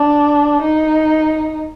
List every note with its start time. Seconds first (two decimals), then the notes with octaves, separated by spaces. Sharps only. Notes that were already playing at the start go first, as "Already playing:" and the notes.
Already playing: D4
0.61 D#4